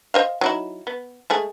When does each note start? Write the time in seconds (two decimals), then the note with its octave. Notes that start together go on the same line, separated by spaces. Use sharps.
0.14 C5 D#5 F5
0.41 F#3 D#4 E4
0.87 B3
1.30 G#3 A3 G#4